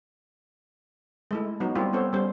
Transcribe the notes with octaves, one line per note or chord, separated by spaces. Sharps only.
G#3 A3 E4
F#3 B3 D#4
G3 A#3 C4 E4 F4 G4
B3 C4 A4 C5 C#5
G3 C#4 C5